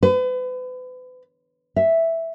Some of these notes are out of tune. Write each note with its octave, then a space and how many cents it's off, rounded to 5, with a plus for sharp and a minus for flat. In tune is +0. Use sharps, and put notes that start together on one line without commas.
B4 +40
E5 +0